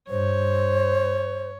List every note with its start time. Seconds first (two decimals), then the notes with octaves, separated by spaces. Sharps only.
0.10 G2 C5 C#5